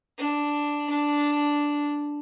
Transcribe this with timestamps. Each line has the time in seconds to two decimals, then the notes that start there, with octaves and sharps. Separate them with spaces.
0.19 D4
0.90 D4